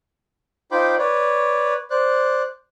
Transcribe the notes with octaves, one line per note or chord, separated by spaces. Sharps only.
D#4 F4 C5 G5 B5 D6
B4 C#5 D5
C5 D5 F#6